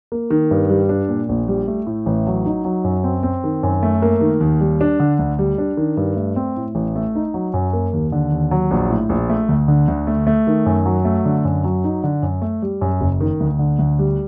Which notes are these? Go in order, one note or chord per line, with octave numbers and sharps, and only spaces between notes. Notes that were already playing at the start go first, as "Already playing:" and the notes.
A#3
D#3
G2
G3
D4
A#2
A#1
G3
A3
A2
A1
F#3
D#4
F#3
F#2
C4
C4
D#3
F#2
A3
A#3
D#3
D#2
G3
D4
D3
D2
G3
D4
D#3
G2
A3
C4
A2
A1
A3
D#4
F#3
F#2
A#3
D#2
D3
D#2
F#3
A#1
A2
A#1
A3
D2
D3
D2
A3
A3
D#3
F#2
F#3
A3
D3
F#2
F#3
D#4
D3
F#2
A3
G3
F#2
F#1
D#3
D2
D3
D2
G3